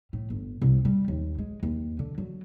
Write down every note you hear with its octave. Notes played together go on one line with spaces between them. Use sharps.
A2
G1
C2
G3
D#2
G#3
D#2
D3
F#3